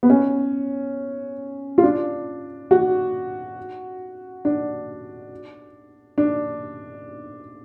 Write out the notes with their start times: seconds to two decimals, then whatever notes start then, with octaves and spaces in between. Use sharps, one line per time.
0.03 B3
0.10 C#4
1.78 F4
1.83 D4
2.71 F#4
4.45 D4
6.18 D4